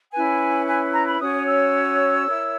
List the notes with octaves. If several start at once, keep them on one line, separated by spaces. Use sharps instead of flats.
C#4 E4 B4 G#5
G#5
A#5
B5
C#4 F#4 C#5 D#6
E6
E4 A#4 C#5